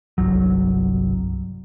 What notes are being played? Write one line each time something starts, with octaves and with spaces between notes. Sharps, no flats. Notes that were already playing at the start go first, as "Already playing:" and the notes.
G1 C2 F#3